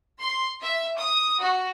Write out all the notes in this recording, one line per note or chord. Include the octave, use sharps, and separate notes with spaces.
C6
E5
D#6
F#4